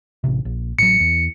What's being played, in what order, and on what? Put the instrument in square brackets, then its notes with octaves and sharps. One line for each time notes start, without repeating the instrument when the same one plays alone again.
[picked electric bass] A1 C3
A#1
[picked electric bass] A1 F#3 [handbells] C#7
[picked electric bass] E2